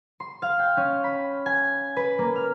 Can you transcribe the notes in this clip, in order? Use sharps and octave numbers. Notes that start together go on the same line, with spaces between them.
C6
F5
G5
C#4
B5
G#5
B4
A#3
F6